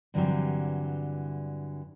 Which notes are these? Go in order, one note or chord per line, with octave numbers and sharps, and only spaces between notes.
G2 D3 E3 F#3 G3 C4